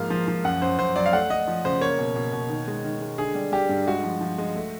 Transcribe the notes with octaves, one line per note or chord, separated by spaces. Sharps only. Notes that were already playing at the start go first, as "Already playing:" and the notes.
Already playing: G#2 F3 A#3 F5
F3
F3
F#2 F#5
F#2 C5
F#2 C5
F#3 D5
F5
A3 F#5
A3 D#5
F3
C#3 C5
A#3 C#5
B2
B2
B2
D#3
G#3
D#3
G#3
D3 G#4
G3
G3 G4
G2
G#3 F#4
F3
F3
G#3
A3